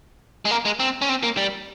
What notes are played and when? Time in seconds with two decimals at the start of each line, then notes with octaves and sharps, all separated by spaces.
0.45 G#3
0.51 A#3
0.65 G#3
0.80 C4
1.02 C#4
1.09 C4
1.23 A#3
1.37 G3